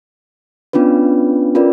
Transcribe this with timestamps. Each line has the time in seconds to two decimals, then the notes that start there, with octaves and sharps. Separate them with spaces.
0.73 B3 C#4 D4 F4 B4
1.55 C#4 F4 A#4 B4 D5